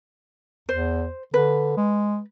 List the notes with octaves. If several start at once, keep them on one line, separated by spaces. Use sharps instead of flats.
E2 C5
D3 B4
G#3